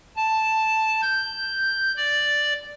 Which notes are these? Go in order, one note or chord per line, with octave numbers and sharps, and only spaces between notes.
A5
G6
D5